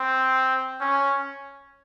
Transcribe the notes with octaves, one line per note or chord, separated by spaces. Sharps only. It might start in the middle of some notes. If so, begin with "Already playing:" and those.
Already playing: C4
C#4